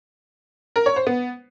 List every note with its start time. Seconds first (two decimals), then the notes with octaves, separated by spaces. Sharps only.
0.76 A#4
0.86 C#5
0.96 C5
1.07 B3